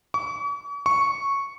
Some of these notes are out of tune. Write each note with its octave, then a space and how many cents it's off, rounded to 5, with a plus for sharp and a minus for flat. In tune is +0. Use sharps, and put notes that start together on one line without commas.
C#6 +45
C#6 -5